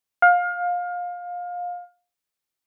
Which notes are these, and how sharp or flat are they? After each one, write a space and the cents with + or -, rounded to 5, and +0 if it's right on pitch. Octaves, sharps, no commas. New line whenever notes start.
F5 +25